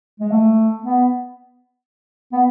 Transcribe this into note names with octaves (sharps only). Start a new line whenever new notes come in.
G#3
A3
B3
B3